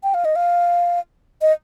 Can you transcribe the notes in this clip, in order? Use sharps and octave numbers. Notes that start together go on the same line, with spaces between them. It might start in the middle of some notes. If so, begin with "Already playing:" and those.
G5
F5
D#5
F5
D#5